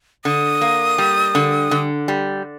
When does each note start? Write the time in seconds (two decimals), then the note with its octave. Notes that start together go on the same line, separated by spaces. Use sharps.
0.25 D3 D#6
0.61 A#3
0.98 G3
1.35 D3
1.71 D3
2.08 G3